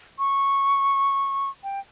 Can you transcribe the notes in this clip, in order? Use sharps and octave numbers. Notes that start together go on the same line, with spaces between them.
C#6
G5